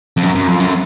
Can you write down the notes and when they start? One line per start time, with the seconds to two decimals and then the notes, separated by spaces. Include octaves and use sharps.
0.17 F2
0.23 F#2
0.35 F#2
0.47 F2
0.60 F#2